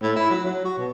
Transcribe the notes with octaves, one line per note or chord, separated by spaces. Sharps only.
A2
E4
F#3
F#3
F#4
B2